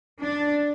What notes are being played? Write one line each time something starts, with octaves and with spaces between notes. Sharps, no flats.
D4